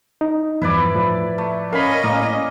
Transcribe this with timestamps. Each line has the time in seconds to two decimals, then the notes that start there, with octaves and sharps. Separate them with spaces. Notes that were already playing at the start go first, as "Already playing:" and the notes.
0.21 D#4
0.62 E2 G2 F3 E4 B4 D5
0.95 A2 F3
1.38 A3
1.73 C#4 A#4 D#5 F5 G#5 B5
2.04 A2 A#3